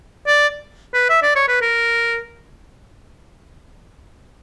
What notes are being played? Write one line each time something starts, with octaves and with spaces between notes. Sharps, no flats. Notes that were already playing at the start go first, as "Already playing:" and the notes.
D5
B4
E5
D5
C#5
B4
A#4